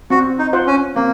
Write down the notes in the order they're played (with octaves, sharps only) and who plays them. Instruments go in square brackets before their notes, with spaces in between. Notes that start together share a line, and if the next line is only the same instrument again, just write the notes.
[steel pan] C4 [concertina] F#4
[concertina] D#4
[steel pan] F4 C5 F#5
[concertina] C#4
[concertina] A#3 [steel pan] C4